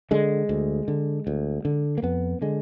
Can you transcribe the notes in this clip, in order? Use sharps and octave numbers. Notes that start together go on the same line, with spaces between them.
D3 G#3
D2
D3
D2
D3
A#3
F2 B3
D3 G#3